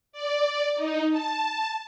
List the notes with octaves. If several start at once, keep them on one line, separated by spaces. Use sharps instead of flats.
D5
D#4
A5